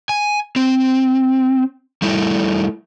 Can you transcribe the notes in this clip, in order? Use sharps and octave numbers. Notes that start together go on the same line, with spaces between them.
G#5
C4
G3 A3 E4